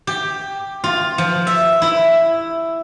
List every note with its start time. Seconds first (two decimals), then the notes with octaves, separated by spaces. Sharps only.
0.07 G4
0.84 F4
1.18 F3
1.47 E5
1.82 E4